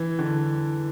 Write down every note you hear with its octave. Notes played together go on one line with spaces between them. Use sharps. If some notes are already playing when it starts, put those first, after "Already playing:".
Already playing: E3
D3